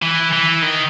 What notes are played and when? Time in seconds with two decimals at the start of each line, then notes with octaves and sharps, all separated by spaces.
0.03 E3
0.33 E3
0.62 D#3